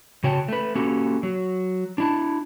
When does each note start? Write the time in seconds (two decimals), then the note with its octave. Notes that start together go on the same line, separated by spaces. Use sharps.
0.24 C#3 F#4 C#5 G5 A5
0.48 A3 B4
0.75 A#3 C#4 F#4 G4 A4
1.23 F#3
1.98 D4 E4 A5